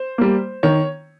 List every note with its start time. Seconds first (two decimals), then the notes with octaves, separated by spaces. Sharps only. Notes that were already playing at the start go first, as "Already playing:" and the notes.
Already playing: C5
0.18 G3 A#3
0.63 D#3 C#5